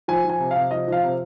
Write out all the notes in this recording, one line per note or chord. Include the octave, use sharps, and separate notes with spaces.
F3 G#5
F3
G#5
C3
C3 F5
F3 D#5
F3 F5
C3